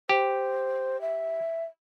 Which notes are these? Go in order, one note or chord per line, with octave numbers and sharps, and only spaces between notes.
G4 C5
E5